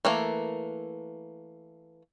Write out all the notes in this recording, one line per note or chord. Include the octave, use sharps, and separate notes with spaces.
E3 A3 A#3